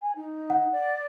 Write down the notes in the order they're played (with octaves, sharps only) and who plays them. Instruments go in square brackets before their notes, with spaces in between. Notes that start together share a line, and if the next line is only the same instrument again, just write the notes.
[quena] G#5
D#4
[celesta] F#5
[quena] D5